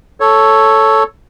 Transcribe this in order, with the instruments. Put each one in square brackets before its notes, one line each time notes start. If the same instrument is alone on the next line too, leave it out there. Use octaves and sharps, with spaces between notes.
[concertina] A4 C#5